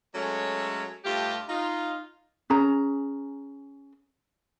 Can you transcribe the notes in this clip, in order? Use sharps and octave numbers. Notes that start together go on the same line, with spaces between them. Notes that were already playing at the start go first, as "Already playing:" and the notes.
F#3 G#3 A3 C#4 A4 C#5
G2 A3 F4 G4
D#4 F4
C#4 G#4 A#5